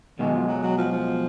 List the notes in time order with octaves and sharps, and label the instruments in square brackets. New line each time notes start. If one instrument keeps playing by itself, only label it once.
[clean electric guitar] B1 B2 G#3 [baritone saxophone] D#3
[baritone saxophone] F3
F#3
F#3
F3
F3